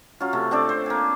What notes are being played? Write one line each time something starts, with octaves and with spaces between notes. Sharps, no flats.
F#3 C#4 F4
C3 A3
C4 D4 A4 D5
C5
A#3 G#5